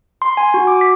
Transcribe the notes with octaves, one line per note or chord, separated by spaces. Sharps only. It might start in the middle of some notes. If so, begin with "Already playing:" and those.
C6
G#5
F#4
D6
B6